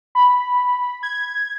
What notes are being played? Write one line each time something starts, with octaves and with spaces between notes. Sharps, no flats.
B5
G#6